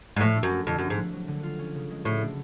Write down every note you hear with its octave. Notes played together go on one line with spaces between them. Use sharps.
G#2
A2 F3
D4
F#2
A3
F2 D3
F#2
D3
G#2
F3
F#3
D3
F4
C#4
C#3
G#3
A2 F#4
D4